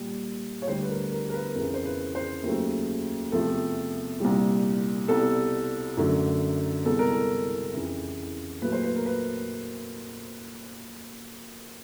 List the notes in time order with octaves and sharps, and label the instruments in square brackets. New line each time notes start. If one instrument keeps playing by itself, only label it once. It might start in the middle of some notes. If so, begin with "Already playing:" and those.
Already playing: [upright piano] A#2 G3
C#5
D2 D3 G3 C5
B4
A#4
A#4
A#4
B4
F2 C#3 E3 A#4
C5
B4
C5
D#2 C#3 F#3 A3
E2 C3 F3 A3 A4
C2 A#2 G3
C2 B2 G3 A4
F#2 D3 F#3 A3
C2 B2 G#3 A4
A#4
A4
F2 C#3 E3
A#2 F#3 A3 B4
C5
B4
A#4
B4